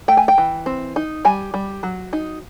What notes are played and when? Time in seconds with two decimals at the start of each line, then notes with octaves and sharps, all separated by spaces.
0.08 A3 G5
0.17 G#5
0.28 G5
0.38 E3
0.66 C4
0.96 D#4
1.25 G3 G#5
1.54 G3
1.83 F#3
2.13 D#4